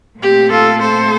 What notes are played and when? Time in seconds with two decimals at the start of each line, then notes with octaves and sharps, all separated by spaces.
0.20 A#2 A3 C4 G4
0.51 F4 A4
0.81 A4 C5